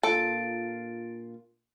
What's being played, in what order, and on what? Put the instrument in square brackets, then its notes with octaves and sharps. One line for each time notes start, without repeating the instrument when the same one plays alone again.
[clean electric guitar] A#2 D4 F4 [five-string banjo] A4 [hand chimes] A6 D7